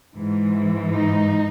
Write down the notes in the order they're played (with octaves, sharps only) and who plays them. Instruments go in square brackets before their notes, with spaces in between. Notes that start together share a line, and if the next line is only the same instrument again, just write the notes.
[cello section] G#2 E3
D#4